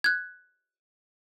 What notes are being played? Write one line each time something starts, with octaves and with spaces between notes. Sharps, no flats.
F#6 G#6